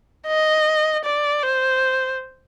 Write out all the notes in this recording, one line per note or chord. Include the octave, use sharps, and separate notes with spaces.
D#5
D5
C5